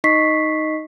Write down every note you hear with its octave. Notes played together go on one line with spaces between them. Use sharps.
D#4 D#5 C#6 B6 C7